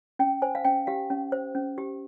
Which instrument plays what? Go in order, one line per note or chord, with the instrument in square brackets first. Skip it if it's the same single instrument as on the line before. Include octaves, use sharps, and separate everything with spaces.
[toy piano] C#4 G5
C5 G#5
F5
C#4 G5
G4 F5
C#4
C5
C#4
G4